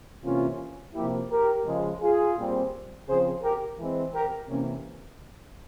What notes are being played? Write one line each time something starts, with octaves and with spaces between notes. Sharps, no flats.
C3 E3 A#3 C#4 F4
C3 F3 A#3 E4 G4
G4 A#4
C#3 F3 G#3
F4 G#4
A#2 G3 C4
C#3 F3 C4 G#4 C5
G4 A#4
E3 G#3 C4
G4 A#4
C3 E3 A#3 C#4